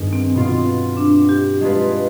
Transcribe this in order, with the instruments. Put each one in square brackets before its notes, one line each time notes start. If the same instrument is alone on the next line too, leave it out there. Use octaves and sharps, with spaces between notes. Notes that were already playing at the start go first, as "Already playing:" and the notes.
Already playing: [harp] G2 D#3 B3 G#4
[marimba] C4
[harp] B2 B3 F4
[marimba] D4
G4
[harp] G#3 D4 F4 B4